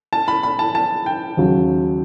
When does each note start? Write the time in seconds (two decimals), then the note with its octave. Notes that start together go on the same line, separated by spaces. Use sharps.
0.13 A5
0.28 B5
0.43 B5
0.59 A5
0.75 A5
1.06 G5
1.37 D#2 C#3 F#3